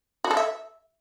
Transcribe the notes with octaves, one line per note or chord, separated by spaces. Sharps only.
F#4
A4
E5